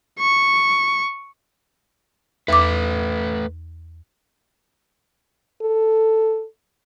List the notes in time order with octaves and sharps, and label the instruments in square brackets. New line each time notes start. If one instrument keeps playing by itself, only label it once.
[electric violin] C#6
[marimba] E2 D6 [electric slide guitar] A3 B4
[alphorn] A4